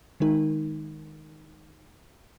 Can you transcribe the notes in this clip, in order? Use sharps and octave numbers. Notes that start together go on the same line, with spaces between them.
D#3 G#3 D#4 A#4